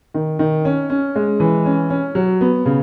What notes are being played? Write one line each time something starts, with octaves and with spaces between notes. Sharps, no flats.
D#3
D#3
C#4
C#4
G#3
E3
C#4
C#4
F#3
B3
C#3